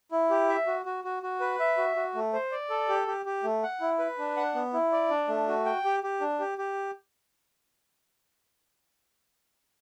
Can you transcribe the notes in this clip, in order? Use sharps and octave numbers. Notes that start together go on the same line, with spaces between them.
E4
G4
E5
F#4
F#4
F#4
F#4
B4
E5
F#4
F#4
A3
C5
D5
A4
G4
G4
G4
A3
F#5
E4
B4
D4
F#5
B3
E4
D5
D4
A3
F#4
G5
G4
G4
D4
G4
G4